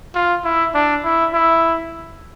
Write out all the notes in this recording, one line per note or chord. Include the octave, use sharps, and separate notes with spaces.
F4
E4
D4
E4
E4